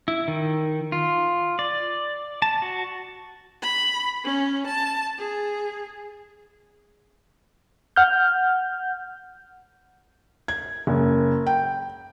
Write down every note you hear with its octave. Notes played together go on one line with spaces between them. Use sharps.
E4
D#3
F4
D5
A5
F#4
B5
C#4
A5
G#4
F#5 F6 G6
G#6
F#1
G5